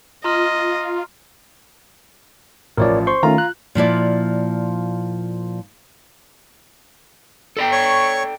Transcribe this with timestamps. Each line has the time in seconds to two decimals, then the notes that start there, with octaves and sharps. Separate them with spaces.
0.24 F4 D#5 A#5 C6 F6
2.77 A1 F3 A#4 C#5 D5
3.07 C5 C6 C#6
3.23 D#3 A3 C#4 F4 A#5
3.38 F#6
3.75 A#2 F3 E4 D5
7.57 A4 D5 G5
7.72 C#5 C#6